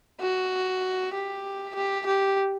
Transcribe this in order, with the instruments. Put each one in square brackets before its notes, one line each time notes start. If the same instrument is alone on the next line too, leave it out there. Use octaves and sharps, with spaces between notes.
[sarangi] F#4
G4
G4
G4